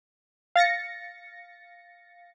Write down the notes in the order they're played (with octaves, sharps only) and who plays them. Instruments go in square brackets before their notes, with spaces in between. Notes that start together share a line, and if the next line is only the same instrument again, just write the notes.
[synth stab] F5 A6 A#6 C#7